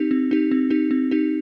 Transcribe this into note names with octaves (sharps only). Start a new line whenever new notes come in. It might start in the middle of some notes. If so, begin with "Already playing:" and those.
Already playing: C4 D#4 G4
C4
D#4 G4
C4
D#4 G4
C4
D#4 G4